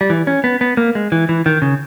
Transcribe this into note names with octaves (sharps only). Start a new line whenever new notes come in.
G3
E3
C#4
B3
B3
A#3
G#3
E3
E3
D#3
C#3